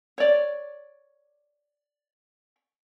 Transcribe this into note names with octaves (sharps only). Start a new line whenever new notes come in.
C#5 D5